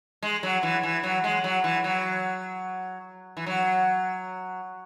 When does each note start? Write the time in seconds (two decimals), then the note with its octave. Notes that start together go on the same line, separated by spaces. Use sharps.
0.23 G#3
0.43 F#3
0.63 E3
0.83 E3
1.03 F#3
1.24 G#3
1.44 F#3
1.64 E3
1.84 F#3
3.37 E3
3.46 F#3